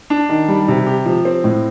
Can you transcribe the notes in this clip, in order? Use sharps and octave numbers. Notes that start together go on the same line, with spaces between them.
D4
D#3
G3
C3
G4
F3
C4
A2